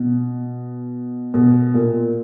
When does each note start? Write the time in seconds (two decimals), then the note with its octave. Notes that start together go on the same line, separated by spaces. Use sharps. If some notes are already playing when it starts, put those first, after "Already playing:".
Already playing: B2
1.34 B2
1.74 A#2